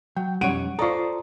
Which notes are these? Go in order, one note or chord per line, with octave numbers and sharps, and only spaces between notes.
F#3 G5
B1 F2 G3 C#4 C#5 F#5 D7 D#7
F4 A4 C5 D5 A#5 C#6 D#6